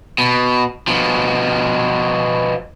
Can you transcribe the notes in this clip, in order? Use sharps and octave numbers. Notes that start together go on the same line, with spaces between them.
B2
B2 F3